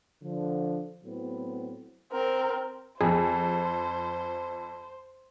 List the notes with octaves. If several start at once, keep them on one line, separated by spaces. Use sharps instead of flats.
D3 F3
A2 F#3 B3 C4
C4 A#4
F2 G#4 C5